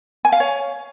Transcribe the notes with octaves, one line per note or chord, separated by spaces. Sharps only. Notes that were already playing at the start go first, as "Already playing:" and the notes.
G#5
F5
C#5